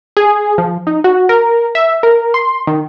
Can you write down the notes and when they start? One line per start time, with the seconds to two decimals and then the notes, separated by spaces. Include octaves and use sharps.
0.17 G#4
0.58 F3
0.87 D#4
1.04 F#4
1.29 A#4
1.75 E5
2.03 A#4
2.34 C6
2.67 D#3